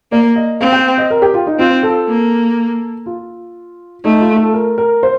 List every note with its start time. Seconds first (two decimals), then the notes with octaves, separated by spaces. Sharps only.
0.12 A#3 D5
0.36 D#5
0.61 C4 F5
0.72 G5
0.98 D#5
1.10 A#4
1.22 G4
1.34 F4
1.47 D#4
1.59 C4 F4
1.83 A4
2.08 A#3
3.06 F4
4.04 A3 D#4
4.21 F4
4.37 A4
4.54 A#4
4.78 A#4
5.03 C5